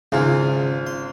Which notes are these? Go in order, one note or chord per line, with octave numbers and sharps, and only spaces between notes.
G#1 C#3 E3 F4
C6